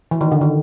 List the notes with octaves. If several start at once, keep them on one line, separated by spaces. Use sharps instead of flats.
E3
D#3
D3
D#3